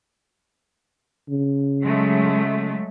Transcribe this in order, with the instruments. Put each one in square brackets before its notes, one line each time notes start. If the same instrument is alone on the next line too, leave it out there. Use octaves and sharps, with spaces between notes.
[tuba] C#3
[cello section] F#3 G#3 A3